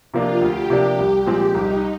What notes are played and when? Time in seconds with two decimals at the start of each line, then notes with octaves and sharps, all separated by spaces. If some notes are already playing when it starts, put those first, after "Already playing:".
0.14 C3 F3 A#3 D4 F4
0.41 D2 G4
0.70 C3 F3 A#3 D4
0.99 C2
1.26 A#2 F3 G#3 C4
1.55 C2 D#4